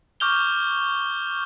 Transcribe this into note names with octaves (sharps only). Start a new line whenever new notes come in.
C#6 D6 F6 G6 F7 G7